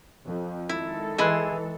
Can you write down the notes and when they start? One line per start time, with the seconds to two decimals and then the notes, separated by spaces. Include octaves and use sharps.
0.24 F2
0.69 D#3 G#3 E4 A4
1.18 E3 E4 G#4 D#5 B5 C6 F#6